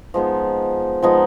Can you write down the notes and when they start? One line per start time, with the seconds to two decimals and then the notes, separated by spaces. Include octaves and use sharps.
0.14 F3 G#3 B3 D#4
1.02 F3 G#3 B3 D#4